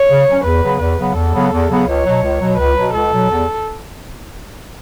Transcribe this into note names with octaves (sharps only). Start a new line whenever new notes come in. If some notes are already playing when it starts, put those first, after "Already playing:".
Already playing: C#5
C#3
F#3 C#4
E2 B4
C#3 F#3 B3
E2 B4
C#3 F#3 B3
E2 A4
C#3 F#3 B3
E2
C#3 F#3 B3
C#2 C#5
B2 F#3
C#2
B2 F#3
C#2 B4
B2 F#3
C#2 A4
B2 F#3
E2